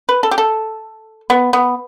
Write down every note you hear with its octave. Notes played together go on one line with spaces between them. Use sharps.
B4
A4
G4
A4
B3
B3